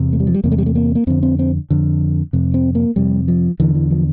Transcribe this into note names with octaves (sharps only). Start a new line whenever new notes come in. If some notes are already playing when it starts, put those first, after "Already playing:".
Already playing: E2 C3
A3
G3
F3
G3
E2 C3 A#3
A3
G3
A3
A#3
A#3
F2 D3 C4
C4
C4
F2 D3
F2 C3
C4
A#3
F2 C3 G3
F3
E2 D3 E3
E3
F3